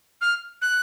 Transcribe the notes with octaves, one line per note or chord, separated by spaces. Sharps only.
F6
F#6